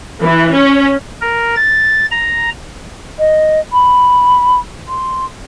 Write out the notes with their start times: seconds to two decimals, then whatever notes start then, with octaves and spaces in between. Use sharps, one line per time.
0.22 E3
0.52 C#4
1.21 A#4
1.56 A6
2.11 A#5
3.19 D#5
3.73 B5
4.89 C6